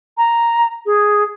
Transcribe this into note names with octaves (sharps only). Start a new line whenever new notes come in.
A#5
G#4